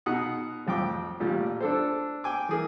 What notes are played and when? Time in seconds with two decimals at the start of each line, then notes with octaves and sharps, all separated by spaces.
0.06 B2 D#4 F#5 D#6
0.67 A1 F2 G5 D6
1.20 A1 A#2 G3
1.60 D4 A4 C5
2.24 G5 G#5 D6
2.49 E3 G#4 A#4